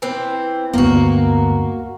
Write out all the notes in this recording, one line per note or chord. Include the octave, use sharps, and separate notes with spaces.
E3 C4
D2 G2 A#3 B3 F#4